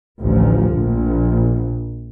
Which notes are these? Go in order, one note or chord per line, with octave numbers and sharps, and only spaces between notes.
A1 D2 F3
A#1